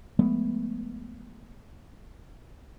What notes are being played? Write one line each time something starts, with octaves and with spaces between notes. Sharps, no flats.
F3 G#3 A3 B3